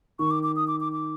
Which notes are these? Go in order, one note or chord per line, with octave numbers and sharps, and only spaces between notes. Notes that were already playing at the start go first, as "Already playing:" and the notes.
D#3 C#6
D6
D6
D#6
D6
D6
D6